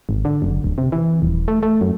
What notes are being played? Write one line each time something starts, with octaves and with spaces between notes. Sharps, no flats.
G#1
D3
F#1
D1
C3
E3
D#1
A3
A3
F#2